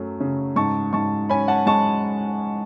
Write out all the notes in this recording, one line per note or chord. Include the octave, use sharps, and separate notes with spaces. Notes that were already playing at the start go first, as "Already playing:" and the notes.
Already playing: F#2 F#3 A3
C#3
G#2 A5 C#6
G#2 A5 C#6
C#4 G#5 B5
F#5 A5
G#3 A5 C#6